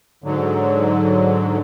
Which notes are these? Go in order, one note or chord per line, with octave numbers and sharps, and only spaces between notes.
G#2 D3 F#3